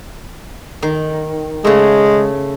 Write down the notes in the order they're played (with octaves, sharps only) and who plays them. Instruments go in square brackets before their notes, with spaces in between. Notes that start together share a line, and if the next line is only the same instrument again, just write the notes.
[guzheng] D#3
[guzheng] C#3 A3 [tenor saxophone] G#3